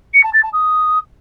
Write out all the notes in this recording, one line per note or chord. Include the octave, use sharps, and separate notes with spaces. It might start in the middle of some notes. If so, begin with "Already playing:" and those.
C#7
A5
A6
A5
D#6